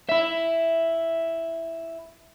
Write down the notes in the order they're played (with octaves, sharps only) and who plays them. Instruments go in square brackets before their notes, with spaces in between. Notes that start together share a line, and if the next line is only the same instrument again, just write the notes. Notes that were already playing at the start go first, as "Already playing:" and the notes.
[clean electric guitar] E4 E5